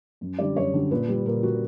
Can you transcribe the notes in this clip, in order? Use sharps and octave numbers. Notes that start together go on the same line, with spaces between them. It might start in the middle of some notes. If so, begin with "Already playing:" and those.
F#2
D3 G3 D5
F#2 C#5
D3 G3
A#2 B4
G3
A#2 A#4
G3 F#4